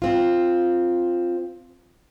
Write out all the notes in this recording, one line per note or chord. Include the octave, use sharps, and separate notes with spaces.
C4 F4